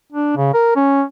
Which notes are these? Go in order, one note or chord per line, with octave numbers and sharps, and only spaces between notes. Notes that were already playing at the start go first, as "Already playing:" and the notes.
D4
C#3
A#4
C#4